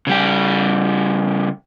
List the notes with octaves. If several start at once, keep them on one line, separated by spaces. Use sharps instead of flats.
C#3 G3 G4